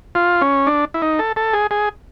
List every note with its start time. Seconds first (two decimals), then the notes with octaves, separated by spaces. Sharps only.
0.15 F4
0.41 C#4
0.67 D4
0.94 E4
1.02 D#4
1.19 A4
1.36 A4
1.53 G#4
1.71 G#4